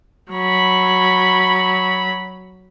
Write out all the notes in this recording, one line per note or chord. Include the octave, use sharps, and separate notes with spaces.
F#3 B5